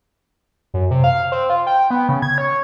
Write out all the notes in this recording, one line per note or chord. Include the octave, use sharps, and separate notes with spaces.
F#2
C3
F5
C4
F4
G5
B3
C#3
G#6
C#5